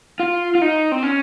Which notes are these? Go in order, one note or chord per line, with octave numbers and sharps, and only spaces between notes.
F4
F4
D#4
C4
C#4